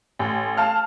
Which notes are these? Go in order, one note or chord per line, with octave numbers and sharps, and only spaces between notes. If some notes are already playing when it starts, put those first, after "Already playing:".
A1
F5 A5 F6